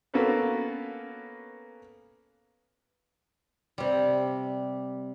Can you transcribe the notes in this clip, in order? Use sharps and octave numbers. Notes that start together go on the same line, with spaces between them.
A#3 B3 C#4 F#4 A4 B4
C3 G3